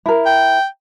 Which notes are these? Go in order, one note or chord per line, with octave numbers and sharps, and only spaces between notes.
E4 A#4
G5